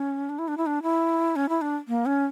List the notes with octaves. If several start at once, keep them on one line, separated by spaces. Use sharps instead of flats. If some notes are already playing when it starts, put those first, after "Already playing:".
Already playing: C#4
D4
E4
D4
E4
D4
E4
C#4
E4
D4
A#3
C#4